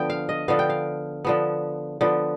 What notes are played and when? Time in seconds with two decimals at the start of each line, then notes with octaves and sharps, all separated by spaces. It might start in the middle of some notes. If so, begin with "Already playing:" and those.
Already playing: D3 F3 B3 G5
0.10 F5
0.29 D#5
0.48 D3 F3 B3 F5
0.59 G5
0.69 F5
1.25 D3 F3 B3
2.01 D3 F3 B3